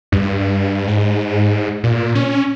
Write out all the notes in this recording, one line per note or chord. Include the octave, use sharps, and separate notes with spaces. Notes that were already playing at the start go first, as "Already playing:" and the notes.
G2
G#2
A#2
C#4